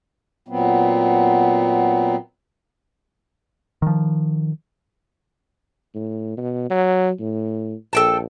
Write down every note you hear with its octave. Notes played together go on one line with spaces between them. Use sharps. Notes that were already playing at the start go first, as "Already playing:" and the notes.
A#2 F#3 B3 C4
D#3 F3
A2
B2
F#3
A2
A#1 A4 G5 A5